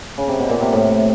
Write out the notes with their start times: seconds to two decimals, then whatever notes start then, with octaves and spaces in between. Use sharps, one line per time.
0.18 C#3
0.28 C3
0.40 B2
0.49 A#2
0.61 C3
0.73 A2